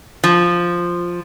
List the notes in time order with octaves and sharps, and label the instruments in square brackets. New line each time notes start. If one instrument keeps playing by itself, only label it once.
[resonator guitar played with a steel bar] F3